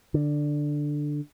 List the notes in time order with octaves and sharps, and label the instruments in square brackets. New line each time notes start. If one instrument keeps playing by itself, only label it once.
[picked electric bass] D3